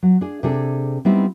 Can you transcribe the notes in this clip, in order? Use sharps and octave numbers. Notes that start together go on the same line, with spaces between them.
F#3
D4 G#4
C3 D4 G#4 A4
G3 B3 C4 D#4 E4